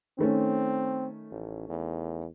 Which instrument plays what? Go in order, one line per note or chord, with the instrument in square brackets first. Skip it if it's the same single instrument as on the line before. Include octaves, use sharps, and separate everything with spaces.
[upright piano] D#3 A3 C#4 [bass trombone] C4
[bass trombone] A1
E2